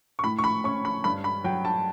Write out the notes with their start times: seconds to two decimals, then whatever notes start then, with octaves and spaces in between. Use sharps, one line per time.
0.19 C#6
0.24 A2 B5
0.39 C#6
0.44 B5
0.64 C#4 C#6
0.85 B5
1.04 G2 B5
1.24 B5
1.44 F#3 G5
1.65 A5